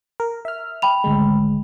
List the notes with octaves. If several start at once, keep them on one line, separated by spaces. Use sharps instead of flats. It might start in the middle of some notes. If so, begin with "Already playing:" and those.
A#4
E5 F6
G5 B5 F7
G#1 D2 G#3